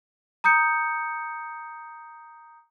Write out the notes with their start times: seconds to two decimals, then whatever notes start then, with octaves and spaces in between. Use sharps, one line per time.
0.44 A#5 D#6 G6 C#7